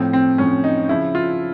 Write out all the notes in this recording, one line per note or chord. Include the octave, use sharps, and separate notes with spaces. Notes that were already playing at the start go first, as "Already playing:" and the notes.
Already playing: A2 F3 C4
C4
A2 F3 C#4
D#4
C#3 F3 E4
F4